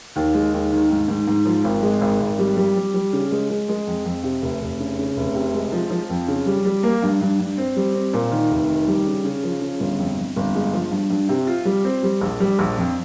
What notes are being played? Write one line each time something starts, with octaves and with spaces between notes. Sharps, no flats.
D#2
G#3
D#2
D#3
G#2
G#2
G#2
F3
G#1
G#3
G#1
G#1
G3
G3
G3
G3
C#3
G#3
G#3
G#3
F2
F2
C3
F1
F1
C#3
C#3
F1
C3
G#3
F3
F3
F2
C#3
G3
G3
A#3
G2
G2
G2
C4
G3
C4
A#2
D#3
F1
D#3
G3
C#3
C#3
F3
C#3
G1
F2
F2
G1
G#3
F3
G2
G2
C3
F4
G3
C4
G3
A#1
G3
A#1
F2